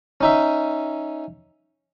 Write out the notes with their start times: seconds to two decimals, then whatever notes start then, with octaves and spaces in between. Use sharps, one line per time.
0.21 C#4 D#4 E5